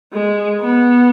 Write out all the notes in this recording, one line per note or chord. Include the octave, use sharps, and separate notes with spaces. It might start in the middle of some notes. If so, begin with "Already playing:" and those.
G#3
B3